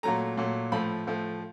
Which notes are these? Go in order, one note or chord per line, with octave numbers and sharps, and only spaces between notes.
A#2 F#3 A3 A#5
A#2 F#3 A3
A2 F3 A3 B5
A2 F3 A3